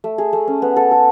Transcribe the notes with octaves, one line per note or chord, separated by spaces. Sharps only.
A3
G#4
A3
C#4
B3
A4
A4